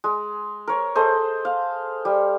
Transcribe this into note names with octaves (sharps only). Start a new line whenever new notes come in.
G#3
A#4 C#5
G#4 A4 C5 D#5
F5
G3